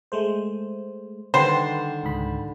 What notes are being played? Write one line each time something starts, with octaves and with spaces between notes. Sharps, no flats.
G#3 A3 C5
D3 D#3 G3 B4 C5 C6
C#2 G#2 B5